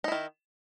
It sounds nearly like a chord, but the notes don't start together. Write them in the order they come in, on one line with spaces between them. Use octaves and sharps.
D#4 E4 D#3